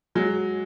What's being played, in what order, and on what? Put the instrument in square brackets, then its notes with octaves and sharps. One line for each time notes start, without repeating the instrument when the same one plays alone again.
[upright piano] F#3 G#3